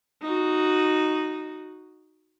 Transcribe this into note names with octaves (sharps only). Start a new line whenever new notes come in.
D#4 F#4